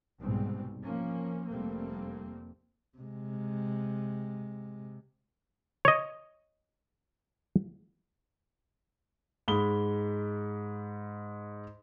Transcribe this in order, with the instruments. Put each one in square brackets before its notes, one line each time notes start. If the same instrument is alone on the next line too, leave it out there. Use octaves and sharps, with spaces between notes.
[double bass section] C2 G#2 B2 G3 C4
F3 A#3 C#4
F1 G3 A3 A#3 C4
[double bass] C3 G#3
[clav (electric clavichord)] C#5 D#5
[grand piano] G#2 G#3 B5 G7